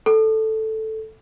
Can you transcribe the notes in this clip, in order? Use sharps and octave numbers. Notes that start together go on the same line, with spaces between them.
A4